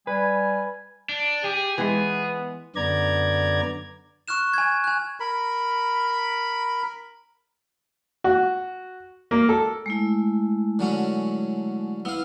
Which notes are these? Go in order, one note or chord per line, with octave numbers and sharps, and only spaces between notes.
G3 B4 G#5
D4
G4 G#4
E3 G#3 B3
F#2 D3 B3 D5 A#5 G#6
C#6 F6 F#6 E7
G#5 G#6
G#5 F#6
A#4 B5
F#4
A#3
A4
G#3 A3 E4
D3 F#3 C#4
B3 E4 F5